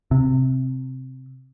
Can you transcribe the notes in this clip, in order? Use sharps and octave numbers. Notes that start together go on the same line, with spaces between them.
C3